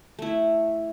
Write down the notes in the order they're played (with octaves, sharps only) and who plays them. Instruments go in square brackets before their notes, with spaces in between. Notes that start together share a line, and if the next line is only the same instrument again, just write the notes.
[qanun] A3 E4